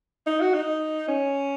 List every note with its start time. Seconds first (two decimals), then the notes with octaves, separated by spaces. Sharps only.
0.27 D#4
0.41 F#4
0.53 D#4
1.08 C#4